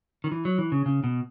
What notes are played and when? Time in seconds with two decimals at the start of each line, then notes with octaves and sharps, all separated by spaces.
0.24 D#3
0.32 E3
0.45 F#3
0.58 E3
0.72 C#3
0.86 C#3
1.04 B2